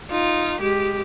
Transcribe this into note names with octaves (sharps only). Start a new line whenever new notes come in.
D#4 F4
G#3 G4